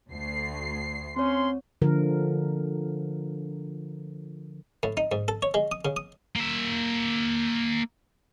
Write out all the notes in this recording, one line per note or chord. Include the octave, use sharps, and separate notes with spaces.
D2 C7
C4 C#4 C#5 C6
D3 F3 A#4
A2
D#4
G#2
A4
C#5
G#3
D#6
C#3
D#6
A#3 E5